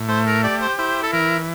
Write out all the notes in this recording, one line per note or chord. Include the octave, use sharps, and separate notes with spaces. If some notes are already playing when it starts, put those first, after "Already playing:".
Already playing: A2
A3 C5
A#4
G4 D5
C5
E4 C5
A4
E3 A#4